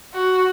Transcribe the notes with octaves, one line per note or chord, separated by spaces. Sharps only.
F#4